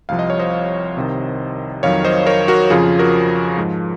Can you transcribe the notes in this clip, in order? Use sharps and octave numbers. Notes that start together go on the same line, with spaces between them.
C2 C3 F3 F5
D#5
C#5
C5 D#5
C2 C3 D#3
F2 D#3 F#3 C#5 F5
C5 D#5
A#4 C#5
F#4 A#4
F2 C#3 F3 F4 G#4
F#4 A#4
G#2 F3